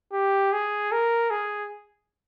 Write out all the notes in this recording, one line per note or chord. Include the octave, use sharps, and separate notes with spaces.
G4
G#4
A#4
G#4